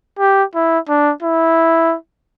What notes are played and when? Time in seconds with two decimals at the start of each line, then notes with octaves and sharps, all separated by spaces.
0.19 G4
0.55 E4
0.88 D4
1.23 E4